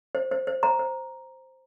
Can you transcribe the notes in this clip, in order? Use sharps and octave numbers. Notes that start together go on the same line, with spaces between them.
C5
C5
C5
C5 A#5
C5